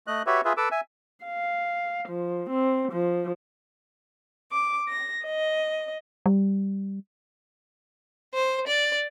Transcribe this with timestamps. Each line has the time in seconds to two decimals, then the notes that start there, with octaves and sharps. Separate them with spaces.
0.07 A3 D#5 F#6
0.26 F#4 G4 B4 C#5 E5
0.45 F4 G#4 B4 E5
0.57 A4 B4 D6 E6
0.72 E5 G#5
1.25 F5
2.09 F3
2.50 C4
2.92 F3
4.52 D6
4.88 A#6
5.25 D#5
6.26 G3
8.34 C5
8.67 D5